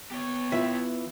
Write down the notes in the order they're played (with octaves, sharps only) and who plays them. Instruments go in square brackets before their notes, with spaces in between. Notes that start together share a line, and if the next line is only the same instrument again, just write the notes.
[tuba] B3 [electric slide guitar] G4 C#5
[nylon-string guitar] E3 F4 [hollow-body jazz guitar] E5